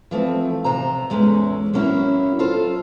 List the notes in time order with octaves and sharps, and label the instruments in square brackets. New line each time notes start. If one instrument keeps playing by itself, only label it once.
[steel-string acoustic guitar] E3 F3 A3 C4
C3 C5 A#5
E2 G#3 A3 C#4
F#3 A#3 C#4 E4 F#4
F4 A4 C5